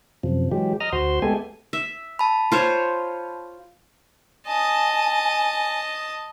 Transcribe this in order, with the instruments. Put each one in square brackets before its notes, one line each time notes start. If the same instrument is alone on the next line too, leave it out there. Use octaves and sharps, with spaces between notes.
[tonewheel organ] F#2 C3 F3
E3 F#3 G#3 G4
D#5 A#5 D#6 F6
D2 F#4 C5 C6
G#3 A3 B3 G4 A4 G#5
[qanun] E5
[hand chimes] A5 B5
[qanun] F4 C5 C#5
[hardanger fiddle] D#5 A5 [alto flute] G#5